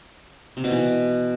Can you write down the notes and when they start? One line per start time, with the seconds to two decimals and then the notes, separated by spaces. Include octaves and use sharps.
0.57 C3
0.64 B2
0.71 E3